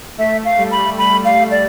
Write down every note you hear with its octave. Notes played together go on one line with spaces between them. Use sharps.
A3 E5
F5
G3
B5
A3 B5
F5
D5